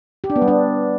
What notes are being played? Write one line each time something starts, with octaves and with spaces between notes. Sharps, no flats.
G4
D4
B3
G3
D4